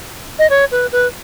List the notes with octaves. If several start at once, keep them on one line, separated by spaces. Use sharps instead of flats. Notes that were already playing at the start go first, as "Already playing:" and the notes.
D#5
C#5
B4
B4